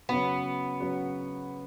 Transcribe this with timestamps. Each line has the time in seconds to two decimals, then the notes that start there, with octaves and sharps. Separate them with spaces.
0.09 C#3 F#3 B3 C#4 F#4 B4
0.80 C#3 F#3 C#4 F#4 B4